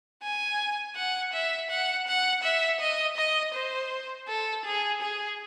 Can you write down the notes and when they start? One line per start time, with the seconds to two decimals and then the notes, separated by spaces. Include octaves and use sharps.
0.22 G#5
0.95 F#5
1.33 E5
1.70 F#5
2.07 F#5
2.43 E5
2.80 D#5
3.17 D#5
3.54 C5
4.28 A4
4.65 G#4
5.01 G#4